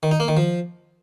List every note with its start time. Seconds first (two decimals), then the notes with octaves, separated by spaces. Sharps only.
0.03 D#3
0.11 D#4
0.20 A#3
0.28 D#3
0.37 F3